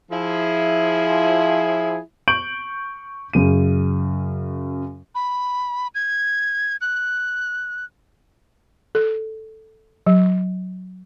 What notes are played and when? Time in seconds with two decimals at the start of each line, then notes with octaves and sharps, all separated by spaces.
0.12 F3 E4 G#4
2.28 C#6 G6 D7 F#7
3.33 F#2 C#3 D#7
5.15 B5
5.95 G#6
6.81 F#6
8.95 A4
10.07 F#3